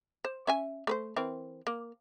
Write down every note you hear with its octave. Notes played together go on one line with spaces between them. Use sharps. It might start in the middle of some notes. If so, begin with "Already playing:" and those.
C5
C#4 E5 G#5
A3 B4 C5
E3 C4 A#4
A#3